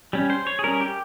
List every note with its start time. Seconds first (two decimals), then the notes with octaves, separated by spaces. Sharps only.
0.13 G3 C#4
0.30 C5
0.47 C#5
0.59 G#4
0.64 G3 C#4 A#4
0.81 G4